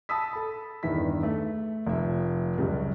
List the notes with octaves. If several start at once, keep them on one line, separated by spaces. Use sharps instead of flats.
A5 B5 D#6 E6 B6
A4 B5
E2 G2 D#3 E4 B6
A3
F1 F3 E5
C#2 F#2 G3